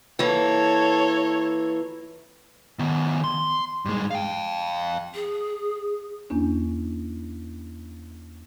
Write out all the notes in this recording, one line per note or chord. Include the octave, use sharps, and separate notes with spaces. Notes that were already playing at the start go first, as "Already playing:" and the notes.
E3 A#3 A4 C#5
D#3 B3
C6
G2 G#3
F5 G5
G#4
E2 A#3 C#4 D4